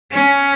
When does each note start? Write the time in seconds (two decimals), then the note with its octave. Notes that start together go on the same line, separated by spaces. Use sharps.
0.12 C#4